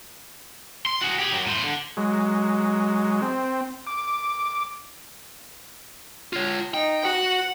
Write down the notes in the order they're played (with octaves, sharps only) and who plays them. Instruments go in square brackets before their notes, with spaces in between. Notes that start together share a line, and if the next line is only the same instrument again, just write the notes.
[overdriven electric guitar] C6
F#4 G#4
G4 G#4
F#2 F#3
A2 C5
D3
[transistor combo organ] F#3 G#3
C4
D6
[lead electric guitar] F4 C#5
[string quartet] D#4 [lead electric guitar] G5
[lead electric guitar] F#4 [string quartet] F#5